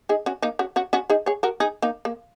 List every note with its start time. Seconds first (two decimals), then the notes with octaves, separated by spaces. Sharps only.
0.09 D#4 G#4
0.26 C#4 F#4
0.42 A#3 D#4
0.59 C#4 F#4
0.76 C#4 F#4
0.93 C#4 F#4
1.10 D#4 G#4
1.26 G#4 C#5
1.43 F#4 A#4
1.60 D#4 G#4
1.82 A#3 D#4
2.05 A#3